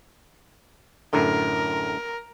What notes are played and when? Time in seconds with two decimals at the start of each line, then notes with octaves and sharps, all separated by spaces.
1.13 F#2 A2 D3 A#4